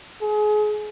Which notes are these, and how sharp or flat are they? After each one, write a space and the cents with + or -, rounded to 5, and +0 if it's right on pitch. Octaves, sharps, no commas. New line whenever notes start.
G#4 +30